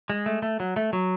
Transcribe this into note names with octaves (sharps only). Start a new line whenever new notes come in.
G#3
A3
A3
F#3
A3
F#3